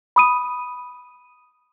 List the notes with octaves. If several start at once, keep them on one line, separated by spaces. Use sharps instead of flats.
B5 D#6 D#7